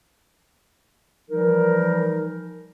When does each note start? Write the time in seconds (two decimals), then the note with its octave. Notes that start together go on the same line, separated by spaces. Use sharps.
1.31 E3 F3 G3 D#4 A#4